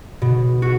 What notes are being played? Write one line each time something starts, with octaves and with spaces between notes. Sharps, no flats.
B2
F#4